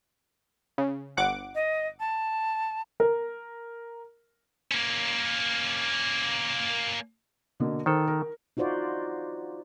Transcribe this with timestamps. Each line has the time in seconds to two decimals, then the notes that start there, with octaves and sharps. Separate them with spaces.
0.78 C#3
1.17 G1 F#5 D6
1.54 D#5
1.99 A5
3.00 A#4
4.72 A#3 C#4
7.60 B2 D3 A#3
7.86 D#3 A4 C5
8.07 A#4
8.57 D#4 F4 F#4 C5 D5